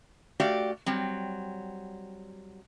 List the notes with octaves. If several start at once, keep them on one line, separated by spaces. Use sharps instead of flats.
A3 F#4 G4 D5 F5
F#3 G3 C4